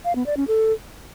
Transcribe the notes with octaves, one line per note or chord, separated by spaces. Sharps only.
F5
B3
D5
C#4
A4